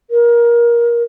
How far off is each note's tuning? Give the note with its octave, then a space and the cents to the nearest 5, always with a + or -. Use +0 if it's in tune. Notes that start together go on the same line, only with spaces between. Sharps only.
A#4 +20